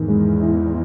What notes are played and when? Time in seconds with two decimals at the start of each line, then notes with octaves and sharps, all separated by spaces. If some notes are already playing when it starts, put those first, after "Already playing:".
Already playing: E2 G#2 D#3
0.08 G#3
0.40 E4